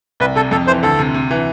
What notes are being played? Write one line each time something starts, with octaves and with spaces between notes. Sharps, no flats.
C2 B4
C3 A4
F2 A4
E3 C5
D2 A4
C3
C3
E3